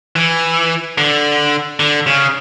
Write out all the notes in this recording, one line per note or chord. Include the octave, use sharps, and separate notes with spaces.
E3
D3
D3
C#3